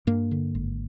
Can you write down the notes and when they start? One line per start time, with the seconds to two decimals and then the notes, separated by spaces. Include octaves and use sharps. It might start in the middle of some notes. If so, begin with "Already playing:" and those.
0.07 G2 A#3
0.31 D3
0.55 G#1